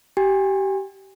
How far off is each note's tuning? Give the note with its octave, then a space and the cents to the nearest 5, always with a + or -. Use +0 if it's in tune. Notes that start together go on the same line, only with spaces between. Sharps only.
G4 -25 G#5 -35